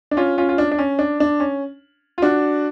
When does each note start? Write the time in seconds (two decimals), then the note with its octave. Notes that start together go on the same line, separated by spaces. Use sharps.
0.11 D4
0.17 C#4 F4
0.38 C#4 F4
0.49 F4
0.58 D4
0.71 D4
0.78 C#4
0.99 D4
1.20 D4
1.40 C#4
2.18 F4
2.22 D4 F#4